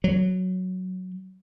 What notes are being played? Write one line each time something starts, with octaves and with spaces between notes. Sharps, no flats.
F#3